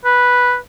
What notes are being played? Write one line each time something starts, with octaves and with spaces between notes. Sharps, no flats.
B4